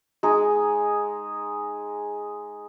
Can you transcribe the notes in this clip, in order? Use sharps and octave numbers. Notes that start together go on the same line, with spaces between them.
G#3 D#4 G#4